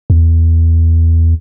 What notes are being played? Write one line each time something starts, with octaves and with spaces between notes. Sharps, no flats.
E2